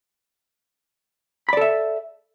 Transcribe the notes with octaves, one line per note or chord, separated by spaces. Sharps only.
A4 D5 E5 B5